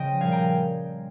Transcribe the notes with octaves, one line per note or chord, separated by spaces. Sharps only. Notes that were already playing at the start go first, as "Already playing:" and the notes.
Already playing: C#3 F3 D#5 G5
A#2 G3 F5 G#5
G5 A#5